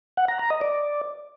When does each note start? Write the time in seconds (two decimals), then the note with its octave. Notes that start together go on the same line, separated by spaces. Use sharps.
0.17 F#5
0.28 A#5
0.39 A#5
0.50 D#5
0.61 D5